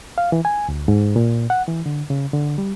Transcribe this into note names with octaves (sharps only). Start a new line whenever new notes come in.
F5
E3
G#5
D2
G#2
A#2
F#5
E3
D3
C#3
D3
G3